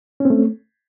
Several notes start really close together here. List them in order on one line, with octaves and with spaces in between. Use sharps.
C#4 C4 A3